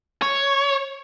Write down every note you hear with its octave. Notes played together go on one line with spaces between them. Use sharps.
C#5